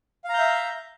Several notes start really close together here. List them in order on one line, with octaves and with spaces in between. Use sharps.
F5 A#5 G6 E5